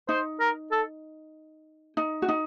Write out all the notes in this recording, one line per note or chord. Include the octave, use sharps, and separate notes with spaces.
D#4 C5
A#4
A4
D#4
F#4
D#4